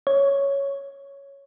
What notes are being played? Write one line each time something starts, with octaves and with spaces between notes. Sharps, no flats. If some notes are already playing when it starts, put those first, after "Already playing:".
C#5